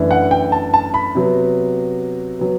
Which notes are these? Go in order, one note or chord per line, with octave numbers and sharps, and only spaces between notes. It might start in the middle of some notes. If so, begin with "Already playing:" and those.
Already playing: F#2 E3 A3 D4
F#5
G5
A5
A5
B5
C3 F#3 B3
F#3 B3